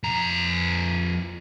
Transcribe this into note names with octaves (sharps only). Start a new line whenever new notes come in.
F2 A#5